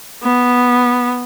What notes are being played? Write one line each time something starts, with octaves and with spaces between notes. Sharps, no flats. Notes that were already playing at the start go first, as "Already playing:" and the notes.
B3